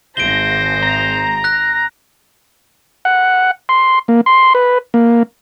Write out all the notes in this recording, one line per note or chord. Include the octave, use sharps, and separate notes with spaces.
G#1 C5 A#6 D7 G7
A#5
F#6 A#6
F#5
C6
A#3
C6
B4
A#3